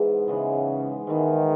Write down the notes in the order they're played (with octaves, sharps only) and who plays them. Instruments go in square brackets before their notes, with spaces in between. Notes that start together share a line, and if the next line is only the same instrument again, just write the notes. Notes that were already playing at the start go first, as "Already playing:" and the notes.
Already playing: [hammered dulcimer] G#2 E3 G#3 B3
[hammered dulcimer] G#2 E3 G#3 B3 [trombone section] C#3
[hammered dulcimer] G#2 E3 G#3 B3 [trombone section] D#3